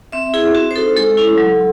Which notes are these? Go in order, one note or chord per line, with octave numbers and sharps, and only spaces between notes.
C4 E5
E4 G#4
C4 F#4
C5
D#4 F#4 A4
G#3 A4
C#4 E4
F#3